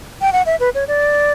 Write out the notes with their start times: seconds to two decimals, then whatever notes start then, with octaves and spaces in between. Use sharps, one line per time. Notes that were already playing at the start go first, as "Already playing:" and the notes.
0.21 G5
0.33 F#5
0.46 E5
0.60 B4
0.75 C#5
0.88 D5